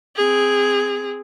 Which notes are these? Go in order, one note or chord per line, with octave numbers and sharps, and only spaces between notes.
C4 G#4